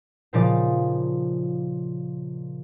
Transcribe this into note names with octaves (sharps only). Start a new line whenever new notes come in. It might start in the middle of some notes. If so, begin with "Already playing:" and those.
A#2 C#3 F3 D#4 D5 A6